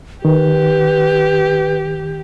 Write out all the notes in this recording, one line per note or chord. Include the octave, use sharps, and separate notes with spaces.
D#3 G4 B4